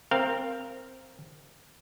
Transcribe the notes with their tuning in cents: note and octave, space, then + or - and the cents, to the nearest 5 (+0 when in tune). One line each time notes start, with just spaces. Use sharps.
C4 +0 A#4 +0 F5 -15